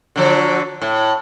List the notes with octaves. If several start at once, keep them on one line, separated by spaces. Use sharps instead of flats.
D3 F3 F#3
A2